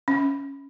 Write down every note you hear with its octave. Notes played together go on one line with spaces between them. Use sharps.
C#4